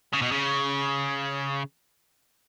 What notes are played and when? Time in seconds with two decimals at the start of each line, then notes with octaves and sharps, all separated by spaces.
0.13 C#3
0.22 B2
0.32 C#3